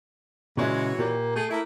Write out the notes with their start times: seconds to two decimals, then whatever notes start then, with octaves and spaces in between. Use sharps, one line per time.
0.57 A#2 C#3 E3 G#3 F#4 C#5 E5
0.99 A#2 A#3 G4
1.36 A3 G#4
1.50 A3 A#3 E4